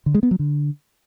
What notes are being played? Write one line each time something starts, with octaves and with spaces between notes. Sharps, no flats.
D3
G#3
B3
F#3
D3